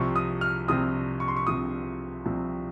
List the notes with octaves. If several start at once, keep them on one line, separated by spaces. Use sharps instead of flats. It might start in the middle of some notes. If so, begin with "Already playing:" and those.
Already playing: C2 C3 F3 C4 C#6
D#6
F6
C2 C3 F3 C4 D#6
C#6
C6
C#6
C2 C3 F3 C4 D#6
C2 C3 F3 C4